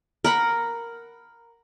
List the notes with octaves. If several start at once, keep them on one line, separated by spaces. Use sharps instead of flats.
A#4 F#5 B5